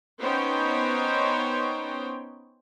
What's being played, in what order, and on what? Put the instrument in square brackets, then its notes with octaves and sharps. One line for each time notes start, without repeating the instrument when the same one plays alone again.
[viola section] B3 C#4 D#4 C5 C#5 G5